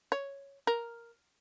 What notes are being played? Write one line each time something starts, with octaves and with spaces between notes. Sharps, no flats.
C#5
A#4